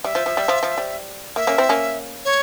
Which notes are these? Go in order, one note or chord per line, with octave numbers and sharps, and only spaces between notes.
G3 E5
F3
F3
G3
F3
F3
G3
A#3 E5
A#3 C#4
C4 E4
A#3 C#4
C#5